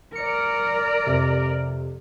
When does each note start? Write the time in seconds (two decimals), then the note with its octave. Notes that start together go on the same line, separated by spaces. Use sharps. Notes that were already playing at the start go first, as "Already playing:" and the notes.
0.15 A#4 D5 C#7
1.06 F2 C3